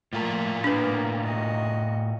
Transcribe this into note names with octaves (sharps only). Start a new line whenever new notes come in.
A2 F3 A3 F4 A#4
A#3 B3 D4 B4
F#4 D#5